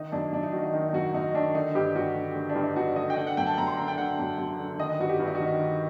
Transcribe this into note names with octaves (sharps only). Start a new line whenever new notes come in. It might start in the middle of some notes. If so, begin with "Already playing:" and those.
Already playing: D#3 D#4
F#2 D4
F#2 D4
D#4
D#3 F#4
D#4
D#3 D#4
D#4
F#2 F#4
F#2 D#4
D#3 D4
D3 D#4
G2 G4
G2 F#4
D3
D3
D4
G2
D#4
G2 F#4
D3 D#5
G5
D3 F#5
F#5
F#2 G5
A5
F#2 A#5
C6
D3 A#5
G5
D3 F#5
F#2
F#2
D3
D#3 D#5
D#5
G2 F#4
G4
G2 F#4
D#4
F#4
D#3
D#3